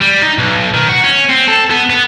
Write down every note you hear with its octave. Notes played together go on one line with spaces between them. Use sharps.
G3
D#4
B1
D#3
F#4
C#4
C4
A4
B3
B3